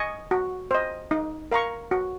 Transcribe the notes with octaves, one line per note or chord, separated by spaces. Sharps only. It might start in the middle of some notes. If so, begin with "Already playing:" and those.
Already playing: D#5 G#5 C#6
F#4
C5 D#5
D#4
A#4 F5 A#5 C#6
F#4